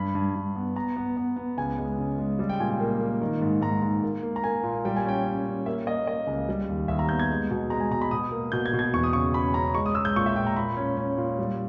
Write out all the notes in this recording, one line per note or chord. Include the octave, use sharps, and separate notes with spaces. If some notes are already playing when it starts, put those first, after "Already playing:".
Already playing: G2 B5
G2
G2
B3
B3 A#5
B3
B3
B3
C#2 G#5
G#3
C#3
G#3
G3
G5
A#2 G#5
G5
A#3
A#3
D#3
G#2
G#2 A#5
G#2
A#3
A#3
A#5
A#3 G#5
A#2
G3 G5
G#5
C#4 G5
C#4
C#4
A#3 E5
A#3 D#5
A#3 D#5
C#2
G3
D#2
D#2 E5
A#5
B3 G6
G#6
G#3
B2
G#3 A#5
G#5
B2 A#5
B5
B2 D#6
A#3
B2 G6
G#6
B2
G#6
E2 C#6
D#6
C#3 C#6
C#4 B5
C#4 A#5
G#3 C#6
D#6
G#3 E6
G6
A#2 C#6
E5
A#2 G5
A#5
A#2 B5
C#4
C#4
A#2
G3